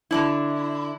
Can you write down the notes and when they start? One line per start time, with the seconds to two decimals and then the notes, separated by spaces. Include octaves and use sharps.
0.11 D3 D4 E4